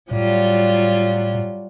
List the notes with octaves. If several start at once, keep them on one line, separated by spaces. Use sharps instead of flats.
A2 F#3 G3 F4